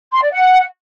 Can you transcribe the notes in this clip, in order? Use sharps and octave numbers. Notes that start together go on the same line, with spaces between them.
C6
D5
F#5